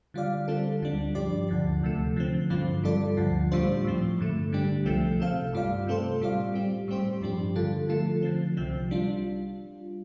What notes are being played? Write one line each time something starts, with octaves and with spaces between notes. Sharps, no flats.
D3 G3 F4 D5 F5
D3 G3 C4 F4 A4
D2 D3 G3 D4
G2 F3 D4 G4 D5
D2 D3 F3
D2 C3 F3 A3
D3 F3 C4
G2 D3 F3 C4 F4
G2 G3 F4 A4 D5
D2 D3 F3
A2 G3 D4 F4 C5
A2 F3 C4
G2 D3 A3
D3 G3 D4 G4
C2 C3 F3 A3 C4
C3 A3 C4 A4 F5
G2 G3 F4 D5 F5
C3 A3 C4 A4 C5
A2 G3 F4 D5 F5
G3 C4 G4
A2 G3 C4 G4 C5
G2 F3 D4 G4
D3 G3 F4 A4
D3 F3 A3 F4 A4
D3 F3 C4
C2 C3 F3 C4
G3 D4 F4